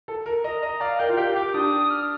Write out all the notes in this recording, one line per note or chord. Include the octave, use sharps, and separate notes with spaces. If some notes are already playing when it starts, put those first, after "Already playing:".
A4
A#4
D#5 A#5
D#5
D5 F5
A#4 G5
F4
F5
G4 G5
G4 D6
D4 D#6
F6